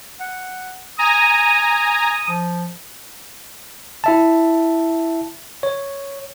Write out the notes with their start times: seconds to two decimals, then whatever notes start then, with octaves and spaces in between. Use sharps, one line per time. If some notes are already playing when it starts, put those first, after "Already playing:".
0.20 F#5
0.99 G#5 A#5 D#6
2.29 F3
4.04 E4 E5 A5
5.63 C#5